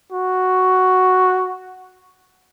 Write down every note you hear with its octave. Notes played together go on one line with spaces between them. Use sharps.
F#4